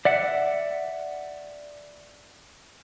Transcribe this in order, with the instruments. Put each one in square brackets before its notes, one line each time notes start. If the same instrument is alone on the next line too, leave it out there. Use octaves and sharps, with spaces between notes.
[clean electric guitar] D5 E5 F#5